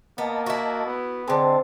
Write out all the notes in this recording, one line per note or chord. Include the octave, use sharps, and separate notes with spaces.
A#3 B3 D#5 A5
E4 F#4
B3
D3 G#3 C4 C5 A5